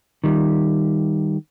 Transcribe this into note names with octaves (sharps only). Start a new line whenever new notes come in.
D#3 G3